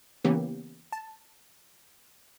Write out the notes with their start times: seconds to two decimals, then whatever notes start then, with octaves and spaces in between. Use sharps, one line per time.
0.24 C#3 E3 A#3 B3 C#4 G4
0.92 A5